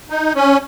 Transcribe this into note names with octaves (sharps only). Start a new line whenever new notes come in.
D#4
C#4